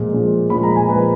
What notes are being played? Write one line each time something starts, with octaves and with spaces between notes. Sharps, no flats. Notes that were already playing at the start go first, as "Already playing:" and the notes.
Already playing: A#2 F3 G#3
A#2 F3 G#3
A#2 F3 G#3 B5
A#5
G#5
A#2 F3 G#3 B4